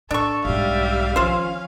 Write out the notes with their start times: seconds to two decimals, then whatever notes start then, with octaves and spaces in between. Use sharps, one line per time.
0.11 A2 D4 A4 C#6
0.45 B1 G#2 G3 E5 F5
1.16 D#3 F3 C#4 F4 C5